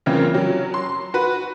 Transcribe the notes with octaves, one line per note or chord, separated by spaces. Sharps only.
C#3 E3 A#3 C4 F4 A#4
F#3 C#4
C6
F#4 B4